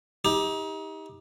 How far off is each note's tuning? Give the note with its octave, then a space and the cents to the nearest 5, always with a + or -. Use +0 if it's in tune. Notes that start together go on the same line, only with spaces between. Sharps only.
D#4 +35 G4 +25